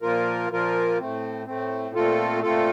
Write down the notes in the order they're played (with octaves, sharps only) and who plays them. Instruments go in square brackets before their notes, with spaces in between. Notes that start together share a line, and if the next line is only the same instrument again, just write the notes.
[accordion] A#2 F3 A#3 F4 A#4
A#2 F3 A#3 F4 A#4
A2 A3 C4
A2 A3 C4
A#2 A3 C4 F4 A4
A#2 A3 C4 F4 A4